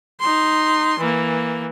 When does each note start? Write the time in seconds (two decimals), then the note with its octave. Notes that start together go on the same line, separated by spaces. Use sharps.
0.20 D#4 C6
1.00 E3 A#3